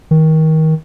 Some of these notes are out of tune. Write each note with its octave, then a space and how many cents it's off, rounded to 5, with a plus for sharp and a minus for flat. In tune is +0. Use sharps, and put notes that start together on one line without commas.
D#3 +25